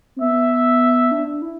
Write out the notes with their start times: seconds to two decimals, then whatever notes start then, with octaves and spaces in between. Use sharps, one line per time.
0.16 C4
0.21 B3 E5
1.11 D4
1.27 D4
1.42 E4